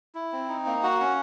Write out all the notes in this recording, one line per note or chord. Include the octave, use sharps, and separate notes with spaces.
E4
C4
D#4
A#3
F#4 F#5
C#4